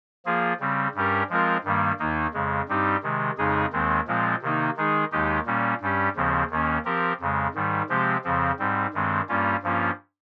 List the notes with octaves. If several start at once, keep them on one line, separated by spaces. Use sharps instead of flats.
F3 A#3 F4 G#4
C#3 G3 C4
G2 G3 C#4 G4 A#4
F3 G#3 C4 F4 A#4
G2 D#3 G3 A#3
D#2 D#3 A#3 D#4
F2 C#3 G#3
G2 G3 C4 D#4 G4
C3 D#3 G#3
F2 C#3 G#3 D#4 G#4
D#2 D#3 G#3 C4
A#2 F3 G#3 C4 F4
C3 D#3 A#3 D#4
D#3 G#3 D#4 G#4
D#2 D#3 G#3 D#4 G4
A#2 G3 A#3 C#4
G2 G3 C#4 G4
D#2 C#3 F3 C4
D#2 D#3 A#3 C#4
F3 C4 G4 A#4
F2 C#3 G#3
G#2 D#3 G3
C3 F3 G#3 C4 G4
F2 C#3 F3 C4
G#2 G3 C4
G2 D#3 G#3 C4
G2 G3 A#3 C#4 F4
G2 F3 A#3 C#4 F4